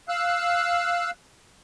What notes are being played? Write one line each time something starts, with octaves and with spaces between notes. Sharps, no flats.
F5 E6 F#6